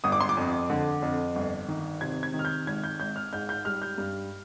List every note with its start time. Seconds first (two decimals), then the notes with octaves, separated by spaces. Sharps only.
0.04 G1 D#6
0.12 D6
0.21 C6
0.29 D6
0.37 F2
0.70 D3
1.02 F2
1.36 G1
1.68 D#3
2.01 C3 G#6
2.23 G#6
2.34 D#3
2.39 F6
2.45 G6
2.67 G#1 G#6
2.84 G6
3.00 G#1 G6
3.16 F6
3.33 G#2 G6
3.49 G6
3.65 G3 F6
3.82 G6
3.98 G2